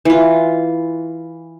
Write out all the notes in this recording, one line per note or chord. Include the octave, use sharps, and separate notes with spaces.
E3 F4